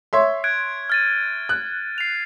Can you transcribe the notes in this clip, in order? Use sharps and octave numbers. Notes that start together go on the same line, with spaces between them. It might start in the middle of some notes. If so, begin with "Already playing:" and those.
C#5 E5 C6
F#6 G#6 D7
F6 A6 D#7
F#6
C7 F7